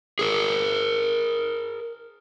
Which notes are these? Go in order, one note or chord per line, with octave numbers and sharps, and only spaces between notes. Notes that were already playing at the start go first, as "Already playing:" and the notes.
G#4 A#4